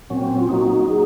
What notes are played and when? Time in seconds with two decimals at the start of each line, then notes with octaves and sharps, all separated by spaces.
0.10 A#2 F#3 C4 C#4
0.39 F4
0.49 F#3 A#3 D#4 F#4
0.88 F#3 A#3 D#4 G#4